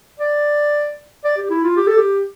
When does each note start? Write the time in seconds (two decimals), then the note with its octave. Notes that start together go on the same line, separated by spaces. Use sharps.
0.20 D5
1.24 D5
1.37 G4
1.50 E4
1.63 F4
1.77 G4
1.87 A4
1.97 G4